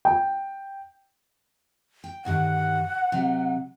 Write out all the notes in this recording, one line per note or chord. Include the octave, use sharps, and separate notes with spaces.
G5
G5
D2 G2 D#3 F#5
C3 F#3